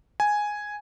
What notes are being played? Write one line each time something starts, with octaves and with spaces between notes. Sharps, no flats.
G#5